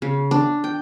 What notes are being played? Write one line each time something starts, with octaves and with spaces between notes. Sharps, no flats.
C#3
D4
G5